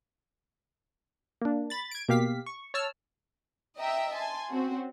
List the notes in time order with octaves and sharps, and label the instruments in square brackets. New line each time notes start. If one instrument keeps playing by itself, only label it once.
[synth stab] A#3 D4
B5 A6
G#6 D7
B2 A#3 G4 F5 B6
C#6
C#5 A5 E6 F6
[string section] D#5 E5 G5 A#5 E6
G#5 A5 C6
C4 C#4 F#4